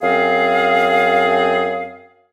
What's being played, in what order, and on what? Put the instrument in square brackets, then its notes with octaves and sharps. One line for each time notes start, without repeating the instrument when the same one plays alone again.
[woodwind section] F#2 C4 G#4 F5